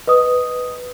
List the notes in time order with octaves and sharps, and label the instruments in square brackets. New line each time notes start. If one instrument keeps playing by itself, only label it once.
[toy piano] B4 [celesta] D#5 D#6